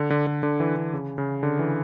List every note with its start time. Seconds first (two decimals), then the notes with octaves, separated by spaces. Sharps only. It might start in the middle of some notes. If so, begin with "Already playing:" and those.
Already playing: D3
0.10 D3
0.27 D3
0.43 D3
0.60 E3
0.76 D3
0.93 C#3
1.18 C#3
1.43 D3
1.59 E3